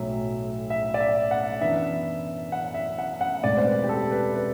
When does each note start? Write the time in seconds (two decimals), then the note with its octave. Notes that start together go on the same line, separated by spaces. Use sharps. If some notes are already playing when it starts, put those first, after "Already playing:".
Already playing: B1 A2 F#3 E5
0.70 E5
0.94 D5
1.00 E5
1.31 F#5
1.61 F#2 E3 B3 D4 E5
2.52 F#5
2.74 E5
2.98 F#5
3.21 F#5
3.43 E1 D2 C3 D5
3.57 C5
3.66 B4
3.84 G4
3.89 A4
4.12 B4
4.35 B4